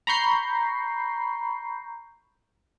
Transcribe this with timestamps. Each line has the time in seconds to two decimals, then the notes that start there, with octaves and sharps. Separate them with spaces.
0.07 A#5 B5 C#6 G6 C7